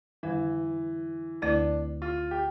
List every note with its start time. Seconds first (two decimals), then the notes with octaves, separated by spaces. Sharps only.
0.23 F2 D3 E3 G3
1.42 D2 D3 A3 D4 E4
2.02 F4
2.31 G4